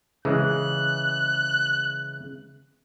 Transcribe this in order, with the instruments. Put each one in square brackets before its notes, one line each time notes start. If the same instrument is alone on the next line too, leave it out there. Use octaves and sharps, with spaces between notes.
[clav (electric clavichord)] C#3 E3 G#3 [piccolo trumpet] F#6